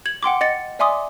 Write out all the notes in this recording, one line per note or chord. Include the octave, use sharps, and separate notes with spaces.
G#6 F#7
F#5 G5 C6 D6
D#5 A6 C#7
D5 E5 G#5 C6 D6 D#6